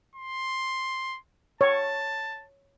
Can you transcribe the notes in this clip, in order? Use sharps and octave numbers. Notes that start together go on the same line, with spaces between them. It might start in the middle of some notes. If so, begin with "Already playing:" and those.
C6
C#5 A5